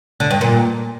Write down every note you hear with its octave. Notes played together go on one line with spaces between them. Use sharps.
D3
G2
A#2